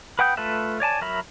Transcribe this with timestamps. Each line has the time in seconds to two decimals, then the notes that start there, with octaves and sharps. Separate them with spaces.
0.19 B4 F#5 G5 D#6 G6
0.37 A3 F4 A4 B4 E5
0.80 C#5 D5 G#5 A5
1.01 F#3 A#4 E5 B5